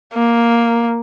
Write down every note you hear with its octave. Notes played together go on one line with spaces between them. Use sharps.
A#3